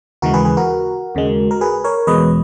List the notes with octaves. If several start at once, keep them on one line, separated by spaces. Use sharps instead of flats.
D#2 C#3 E3 G#3 F#4 A#4
G#4 B4
G#4 B4
F#4 A#4
D#2 C#3 G#3
A#4
G#4 B4
A#4 C#5
E2 B2 G#3 B4 D#5